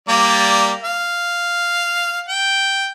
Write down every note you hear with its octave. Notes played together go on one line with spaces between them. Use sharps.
G3 A#3 D5
F5
G5